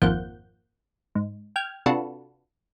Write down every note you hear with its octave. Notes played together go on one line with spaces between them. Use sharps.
G#1 F2 F3 A#3 F#5 G6
G#2
G5 F6 G#6
C3 D4 F4 F#4 A4 B4